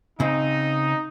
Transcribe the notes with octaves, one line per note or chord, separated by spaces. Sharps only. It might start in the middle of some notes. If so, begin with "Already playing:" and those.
C#3 C4 D#4